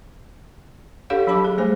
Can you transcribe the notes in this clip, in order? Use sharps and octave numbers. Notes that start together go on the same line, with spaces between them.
D4 G4 A4 C#5 F5 F#5
F#3 D4 C#5 A5 B5 D6
G#4
G3 A3 C5 G#5